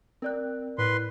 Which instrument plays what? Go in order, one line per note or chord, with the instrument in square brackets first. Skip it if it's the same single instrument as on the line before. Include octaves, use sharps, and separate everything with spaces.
[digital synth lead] C4 [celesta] A#4 D5 F#6
[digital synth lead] A2 [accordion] B4 C6